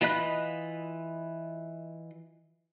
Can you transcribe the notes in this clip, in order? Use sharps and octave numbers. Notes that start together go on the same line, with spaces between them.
E3 F4 D#5 B5 F#6